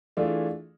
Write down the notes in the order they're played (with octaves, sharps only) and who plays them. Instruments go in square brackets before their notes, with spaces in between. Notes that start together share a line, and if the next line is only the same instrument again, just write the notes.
[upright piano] E3 A3 D4 F4 G#4